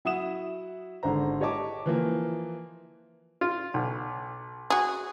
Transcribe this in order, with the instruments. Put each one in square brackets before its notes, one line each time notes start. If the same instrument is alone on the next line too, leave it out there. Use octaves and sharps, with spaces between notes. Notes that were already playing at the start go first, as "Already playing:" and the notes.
[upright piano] F#3 E4 F#5 D#6 E7
G#1 D3 G#3 C5 A#5
G4 C#5 D#5 A5 D6
E3 F3 A#3
[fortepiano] F4
B1
[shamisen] F#4 G#4